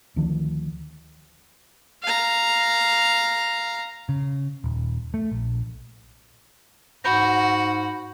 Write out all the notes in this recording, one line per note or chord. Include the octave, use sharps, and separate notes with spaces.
D2 D#3 F3 D4
F5 A#5
C#3
D#1
A3
A#1
G#2 F#4 B5 G6 A#6